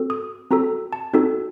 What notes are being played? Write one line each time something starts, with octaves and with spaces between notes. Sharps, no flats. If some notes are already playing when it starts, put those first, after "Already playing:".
Already playing: C4 F#4 A4
D#6
C4 F#4 A4 A#5
A5
C4 D#4 F#4 A4